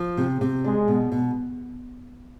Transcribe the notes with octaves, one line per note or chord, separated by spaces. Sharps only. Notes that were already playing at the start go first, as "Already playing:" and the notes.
Already playing: F3
C3
C3
G#3 D4
B2
B2